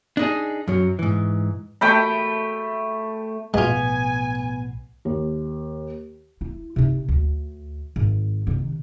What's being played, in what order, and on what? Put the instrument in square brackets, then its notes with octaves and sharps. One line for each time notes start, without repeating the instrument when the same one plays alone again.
[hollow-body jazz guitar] D4 D#4 G#4
F#2 F#3
G#2 E3
[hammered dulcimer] A3 G5 B5
[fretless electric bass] B1 A2 F3 [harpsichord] G#3 F4 [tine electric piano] B3 [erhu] G#5
[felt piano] D#2
[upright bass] E4
C3 D#4
D2
G#1
C3 D#3